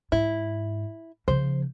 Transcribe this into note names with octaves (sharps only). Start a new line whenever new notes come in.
G#2 E4
C#3 F3 C5